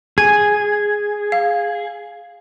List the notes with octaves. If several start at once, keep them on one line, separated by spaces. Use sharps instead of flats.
G#4 G#5
F5